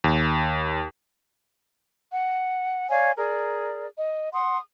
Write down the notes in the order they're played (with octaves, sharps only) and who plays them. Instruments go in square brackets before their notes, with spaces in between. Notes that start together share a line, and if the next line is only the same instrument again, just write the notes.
[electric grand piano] D#2
[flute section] F#5
C#5 D5 F5 G#5
G#4 A#4 D5
D#5
F#5 C6 D#6